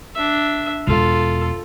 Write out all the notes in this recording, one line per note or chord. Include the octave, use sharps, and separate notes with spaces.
D4 E5
E1 F4 A4